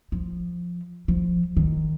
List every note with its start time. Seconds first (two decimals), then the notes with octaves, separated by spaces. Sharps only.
0.12 F3
1.08 F3
1.57 D#3